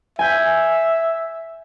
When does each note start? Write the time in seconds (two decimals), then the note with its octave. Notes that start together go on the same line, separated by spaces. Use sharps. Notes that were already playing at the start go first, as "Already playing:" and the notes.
0.19 E5 G#5 G6 B6